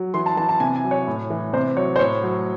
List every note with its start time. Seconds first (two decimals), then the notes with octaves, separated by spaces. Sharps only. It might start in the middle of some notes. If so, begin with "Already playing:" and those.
Already playing: F#3
0.14 E3 C6
0.26 A5
0.37 E3 A5
0.49 A5
0.60 C3 G#5
0.76 G#5
0.84 F#3
0.91 C#5
1.07 A2
1.30 E3
1.53 C3 C5
1.77 F#3 C#5
1.96 C5
1.99 A2 C#5
2.23 F#3